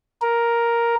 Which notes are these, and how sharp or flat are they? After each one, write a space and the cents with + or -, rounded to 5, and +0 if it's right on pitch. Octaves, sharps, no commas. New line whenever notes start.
A#4 +5